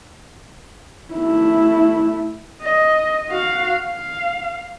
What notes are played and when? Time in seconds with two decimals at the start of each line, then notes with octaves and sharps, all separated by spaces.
1.14 A3 E4
2.62 D#5
3.30 F#4 F5
3.84 F5